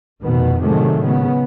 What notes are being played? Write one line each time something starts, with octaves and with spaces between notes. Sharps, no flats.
F1 B2 D#3 B3
A2 C3 D#3 F#3 G#3 A3
C#3 B3